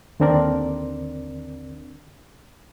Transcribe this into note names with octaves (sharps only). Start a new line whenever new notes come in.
D#2 D3 C4 D4 A#4 D5